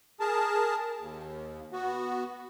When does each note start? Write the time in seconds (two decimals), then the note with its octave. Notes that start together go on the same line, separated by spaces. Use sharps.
0.20 G#4 A#4 A5
1.00 D#2
1.73 B3 F#4